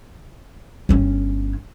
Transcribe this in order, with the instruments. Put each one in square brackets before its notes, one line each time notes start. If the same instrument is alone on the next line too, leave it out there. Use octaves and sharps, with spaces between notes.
[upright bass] G1 C#4